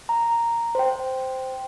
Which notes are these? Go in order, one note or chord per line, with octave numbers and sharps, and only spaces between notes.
A#5
C5 G5